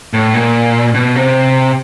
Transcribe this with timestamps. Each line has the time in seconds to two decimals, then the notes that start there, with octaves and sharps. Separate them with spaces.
0.13 A2
0.34 A#2
0.94 B2
1.15 C3